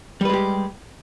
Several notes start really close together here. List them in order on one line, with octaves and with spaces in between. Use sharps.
G3 B4 G#3 G4